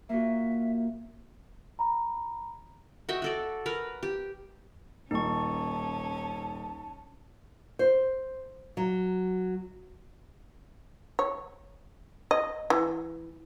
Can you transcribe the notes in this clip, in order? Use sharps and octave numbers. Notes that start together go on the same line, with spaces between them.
A#3 F4 F#4 E5
A#5 B5
F#4 D#5 E5 G5
F#4 A4 D5
A#4 B4
G4
D#1 C#4 D#4 A5 C#6
C5
F#3
C#5
D#5
E3